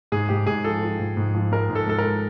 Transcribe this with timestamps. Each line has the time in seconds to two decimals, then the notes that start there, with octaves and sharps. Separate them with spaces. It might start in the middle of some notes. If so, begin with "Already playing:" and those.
0.12 G#2 G#4
0.29 G#2 G4
0.47 G#2 G#4
0.64 F3 A4
0.83 F3
0.99 G#2
1.17 G#2
1.35 F3
1.52 G#3 A#4
1.70 G#2
1.75 A4
1.87 G#3 A4
1.98 A#4